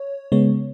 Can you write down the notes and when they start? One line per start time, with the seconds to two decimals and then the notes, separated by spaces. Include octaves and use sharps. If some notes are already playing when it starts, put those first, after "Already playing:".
Already playing: C#5
0.32 C#3 G#3 B3 C#5